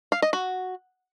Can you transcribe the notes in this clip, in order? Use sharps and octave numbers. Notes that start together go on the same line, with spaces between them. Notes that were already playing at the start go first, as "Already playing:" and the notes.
F5
D#5
F#4